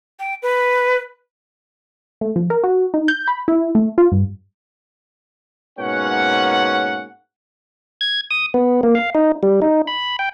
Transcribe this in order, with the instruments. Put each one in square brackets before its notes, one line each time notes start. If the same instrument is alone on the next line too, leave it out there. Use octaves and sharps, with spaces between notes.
[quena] G5
B4
[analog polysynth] A3
F3
A#4
F#4
D#4
G6
B5
E4
A3
F4
G2
[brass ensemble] G#2 B2 A#3 C#4 C#5 F#5
[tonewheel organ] G#6
D#6
B3
A#3
F5
D#4
G3
D#4
B5
G5